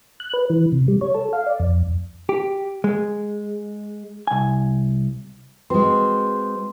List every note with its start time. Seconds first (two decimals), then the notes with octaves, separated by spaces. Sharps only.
0.20 F#6
0.33 B4
0.50 E3
0.72 C3
0.88 G3
1.01 C#5
1.14 A4
1.33 F5
1.46 D5
1.60 F2
2.29 G4
2.84 G#3
4.27 C2 G#5
5.70 G#3 C4 F#4 B4 C6